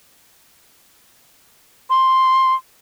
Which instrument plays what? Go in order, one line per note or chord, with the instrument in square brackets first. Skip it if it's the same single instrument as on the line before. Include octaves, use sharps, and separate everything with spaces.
[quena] C6